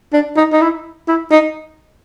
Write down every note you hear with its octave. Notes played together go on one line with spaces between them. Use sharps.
D4
D#4
D#4
E4
E4
D#4